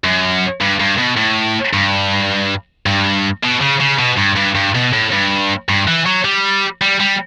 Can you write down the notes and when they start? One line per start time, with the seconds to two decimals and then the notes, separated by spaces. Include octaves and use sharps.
0.04 F#2
0.61 G2
0.80 G2
0.98 B2
1.17 A2
1.73 G2
2.86 G2
3.43 B2
3.61 C#3
3.81 C#3
3.99 B2
4.18 G2
4.37 G2
4.55 G2
4.75 B2
4.93 A2
5.12 G2
5.69 G2
5.88 E3
6.06 F#3
6.25 G3
6.82 G3
7.00 G3